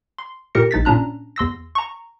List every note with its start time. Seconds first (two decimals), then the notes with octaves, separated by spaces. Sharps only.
0.18 C6
0.55 A#2 G4 A#4 A#6 C#7
0.71 A#1 D#4 A6 B6
0.85 A#2 C#4 D4 A#5 F#6
1.36 E2 C6 E6 A#6
1.75 A#5 C#6